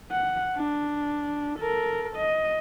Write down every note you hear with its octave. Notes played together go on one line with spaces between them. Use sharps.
F#5
D4
A4 A#4
D#5